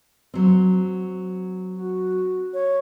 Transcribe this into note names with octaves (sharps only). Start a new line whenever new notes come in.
F#3 C4
F#4
C#5